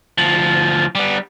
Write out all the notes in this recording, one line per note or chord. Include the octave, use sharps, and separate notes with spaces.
D2 F3
G3 B3